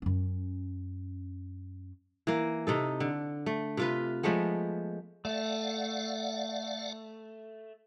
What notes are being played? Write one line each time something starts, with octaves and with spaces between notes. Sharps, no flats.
F#2 C#4
E3 A#3
C3 D#4 A4
D3
A3
C3 F4 B4
F3 G#3 A3 B3
A3 D5 F5 F#5